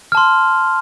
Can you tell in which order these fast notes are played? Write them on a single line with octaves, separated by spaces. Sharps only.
F6 A5 C6